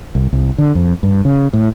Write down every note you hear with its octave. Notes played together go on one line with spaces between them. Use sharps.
C2
C2
D3
F2
G2
C#3
A2